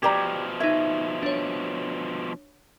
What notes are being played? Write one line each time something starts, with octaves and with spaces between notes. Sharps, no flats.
B2 F3 G4 D5 A#5 G#6
D#4 E5 G#6
D4 C#5